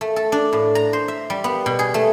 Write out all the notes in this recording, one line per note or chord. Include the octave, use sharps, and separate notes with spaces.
A3
A4
D4
A2
A#5
C5
E5
G3
B3
B2
G#4
A3